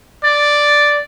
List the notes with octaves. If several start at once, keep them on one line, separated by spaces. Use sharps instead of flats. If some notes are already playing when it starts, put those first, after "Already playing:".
D5